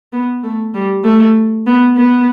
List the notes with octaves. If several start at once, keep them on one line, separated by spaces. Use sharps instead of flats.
B3
A3
G3
A3
B3
B3